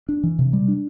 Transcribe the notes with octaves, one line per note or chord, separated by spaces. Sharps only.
D4
E3
C3
G3
D4